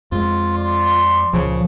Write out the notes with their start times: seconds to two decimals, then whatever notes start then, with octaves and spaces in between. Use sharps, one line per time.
0.12 F2 G#3 F4
0.55 D5 C6
1.33 C#2 A#2 C#3 F3